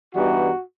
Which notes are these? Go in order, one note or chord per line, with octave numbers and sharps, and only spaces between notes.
G2 E3 G3 B3 D#4 F#4